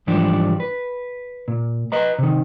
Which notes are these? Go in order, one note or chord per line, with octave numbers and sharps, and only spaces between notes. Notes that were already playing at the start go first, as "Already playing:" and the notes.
G#2 E3 F3 G3 D4 G4
B4
A#2
B4 D#5 A#5
C3 D#3